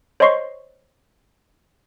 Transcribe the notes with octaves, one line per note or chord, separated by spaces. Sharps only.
C5 C#5 D#5 C6 C#6 C7